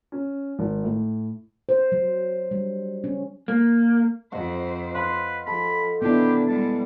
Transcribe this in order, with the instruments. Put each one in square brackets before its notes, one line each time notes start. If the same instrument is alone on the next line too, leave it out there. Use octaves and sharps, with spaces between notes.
[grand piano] C#4
G#1
A2
[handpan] C5
F#3
G3
C#4
[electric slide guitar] A#3
[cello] F2 C5 [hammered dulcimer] D#5 F#5
[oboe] B4 [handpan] F5 [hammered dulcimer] C6
[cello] F3 [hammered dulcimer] A4 [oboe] B5
[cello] D#3 D4 [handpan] B3 E4 [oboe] G4
[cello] G3 G#3 [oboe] A5